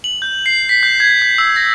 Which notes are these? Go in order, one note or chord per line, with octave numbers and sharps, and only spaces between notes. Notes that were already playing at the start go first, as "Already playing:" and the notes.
F#7
G6
C7
B6
G6
G#6
G#6
E6
A#6